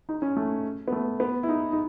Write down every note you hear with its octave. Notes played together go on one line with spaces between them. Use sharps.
D#4
C#4
A3
B3
A3
B3
E4
D#4
D#4